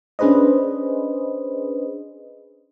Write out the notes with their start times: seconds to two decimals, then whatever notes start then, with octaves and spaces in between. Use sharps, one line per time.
0.19 C#4 D4 G#4 B4 C5 D#5